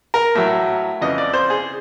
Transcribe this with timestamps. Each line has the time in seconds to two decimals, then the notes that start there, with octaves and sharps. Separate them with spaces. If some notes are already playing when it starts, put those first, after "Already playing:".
0.14 A#4
0.35 A2 F#3 E5
1.01 F2 C#3 E3 D#5
1.18 D5
1.34 C5
1.50 G#4